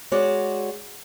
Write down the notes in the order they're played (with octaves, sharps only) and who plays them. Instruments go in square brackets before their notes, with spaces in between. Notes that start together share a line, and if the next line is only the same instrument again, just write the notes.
[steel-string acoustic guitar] G#3 F#4 C#5 D5